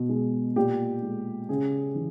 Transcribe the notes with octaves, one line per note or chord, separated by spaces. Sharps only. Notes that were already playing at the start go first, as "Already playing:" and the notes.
Already playing: B2
G#3
A#2 G4
G#3
C#3 G#4
E3